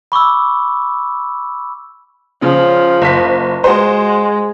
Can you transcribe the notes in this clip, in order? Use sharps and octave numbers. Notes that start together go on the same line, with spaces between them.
B5 C#6 D6 E6
C#3 F3
F#1 B6
G#3 F#4 C5